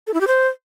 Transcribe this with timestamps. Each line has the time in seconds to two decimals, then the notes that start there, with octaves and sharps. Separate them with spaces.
0.07 A4
0.14 E4
0.21 G4
0.27 C5